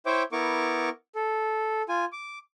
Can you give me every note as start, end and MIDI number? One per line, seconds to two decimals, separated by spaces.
0.06 0.23 64
0.06 0.23 72
0.06 0.23 73
0.06 0.23 76
0.06 0.23 79
0.06 0.23 86
0.32 0.89 59
0.32 0.89 64
0.32 0.89 70
0.32 0.89 85
0.32 0.89 86
1.15 1.82 69
1.89 2.05 65
1.89 2.05 80
2.12 2.39 86